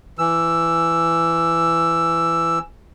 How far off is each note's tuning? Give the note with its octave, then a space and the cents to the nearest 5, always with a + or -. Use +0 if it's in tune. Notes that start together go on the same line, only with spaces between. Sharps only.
E3 +15 E6 +10